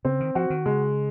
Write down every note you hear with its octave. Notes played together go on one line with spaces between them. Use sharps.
C#3 C4
D#3
F3 F#4
D#3
C#3 G#3